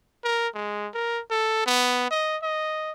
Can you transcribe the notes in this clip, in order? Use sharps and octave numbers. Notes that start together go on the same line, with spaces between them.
A#4
G#3
A#4
A4
B3
D#5
D#5